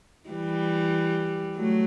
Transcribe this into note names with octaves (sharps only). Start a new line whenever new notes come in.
E3 G3
F#3 A3